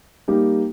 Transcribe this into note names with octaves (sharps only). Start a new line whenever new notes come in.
G3 A#3 D#4 G4